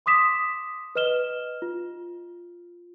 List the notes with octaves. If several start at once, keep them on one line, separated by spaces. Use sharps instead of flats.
C6 D6 D#6 B6 E7
B4 D#5 F6 E7 G7
F4